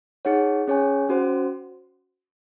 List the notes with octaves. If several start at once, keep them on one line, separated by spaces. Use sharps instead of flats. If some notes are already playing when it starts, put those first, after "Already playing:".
D#4 G#4 C#5 F#5
C#4 G#4 C#5 G#5
C#4 F#4 C5